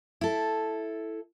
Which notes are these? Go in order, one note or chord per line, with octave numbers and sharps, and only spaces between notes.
E4 A4